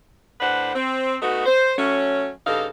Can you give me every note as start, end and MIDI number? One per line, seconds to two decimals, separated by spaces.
0.40 0.72 45
0.40 0.72 62
0.40 0.72 71
0.40 0.72 72
0.40 0.72 78
0.75 1.17 60
1.21 1.45 57
1.21 1.45 59
1.21 1.45 63
1.21 1.45 66
1.46 1.75 72
1.78 2.29 54
1.78 2.29 57
1.78 2.29 61
2.47 2.66 43
2.47 2.66 49
2.47 2.66 63
2.47 2.66 69
2.47 2.66 77